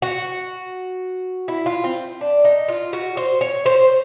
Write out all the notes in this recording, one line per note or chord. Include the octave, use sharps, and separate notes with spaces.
F#4
E4
F4
C4
D4
D#4
F4
F#4
C5
C#5
C5